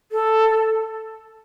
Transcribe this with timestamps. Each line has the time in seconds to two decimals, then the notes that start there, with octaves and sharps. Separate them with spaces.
0.12 A4